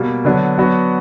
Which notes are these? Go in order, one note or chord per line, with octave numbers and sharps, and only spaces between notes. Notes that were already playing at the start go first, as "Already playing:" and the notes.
Already playing: B2 G3 A#3
D3 F#3 B3 D4
F#3 B3 D4 F#4